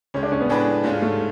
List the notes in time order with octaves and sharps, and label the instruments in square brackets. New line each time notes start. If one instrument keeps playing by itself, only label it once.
[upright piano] C#2 C#3 G#3 [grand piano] C#4
[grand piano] D4
C#4
B3
[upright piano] A2 G#3 D4 G#4 B4
[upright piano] G#2 G#3 C#4 F4 [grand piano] A3
[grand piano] A3